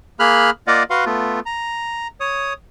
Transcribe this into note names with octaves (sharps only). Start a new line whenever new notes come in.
A#3 G#4 B5 F6 F#6
A#3 F4 D5 D#5 F5 F#5
F#4 B4 F5 F#5 C6
A3 B3 F4
A#5
C#5 D#6